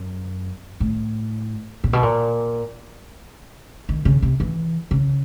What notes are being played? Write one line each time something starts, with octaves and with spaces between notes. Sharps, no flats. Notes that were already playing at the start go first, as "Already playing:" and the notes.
Already playing: F#2
A2
A#2
B2
A#2
D#3
C#3
C3
E3
C#3